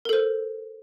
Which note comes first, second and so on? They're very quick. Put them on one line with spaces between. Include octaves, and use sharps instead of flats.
A#4 A4 C5